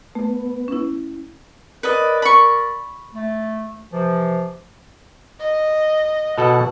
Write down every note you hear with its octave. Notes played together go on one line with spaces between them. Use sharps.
A3 B3
C#4 E4
A#4 B4 D5 D#5
B5 C#6
A3
C3 E3 F3
D#5
B2 F#4 A4 F#5